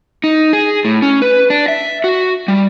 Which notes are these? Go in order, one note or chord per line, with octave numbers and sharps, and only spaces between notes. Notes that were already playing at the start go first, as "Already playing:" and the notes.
D#4
G#4
A2
C#4
B4
D4
E5
F#4
G3